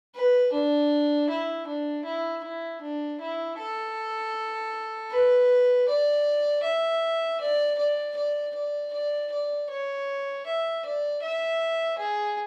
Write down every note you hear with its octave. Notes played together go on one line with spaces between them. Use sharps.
B4
D4
E4
D4
E4
E4
D4
E4
A4
B4
D5
E5
D5
D5
D5
D5
D5
D5
C#5
E5
D5
E5
G#4